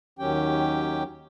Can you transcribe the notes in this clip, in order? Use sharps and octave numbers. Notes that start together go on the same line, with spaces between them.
D#2 D#3 F#3 C#4 G4 G5